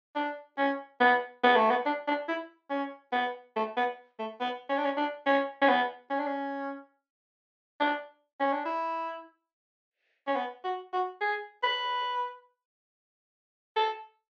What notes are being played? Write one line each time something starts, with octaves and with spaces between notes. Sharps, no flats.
D4
C#4
B3
B3
A3
B3
D4
D4
E4
C#4
B3
A3
B3
A3
B3
C#4
D4
C#4
D4
C#4
C#4
B3
C#4
D4
C#4
D4
C#4
D4
E4
C#4
B3
F#4
F#4
G#4
B4
A4